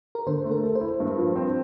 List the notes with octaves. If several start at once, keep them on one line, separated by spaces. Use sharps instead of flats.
A#4
D3 C5
A3
A#4
A4
C5
E4
G2
F3
C4